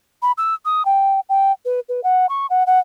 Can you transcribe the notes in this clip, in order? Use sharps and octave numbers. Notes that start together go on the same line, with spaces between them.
B5
E6
D#6
G5
G5
B4
B4
F#5
C#6
F#5
F#5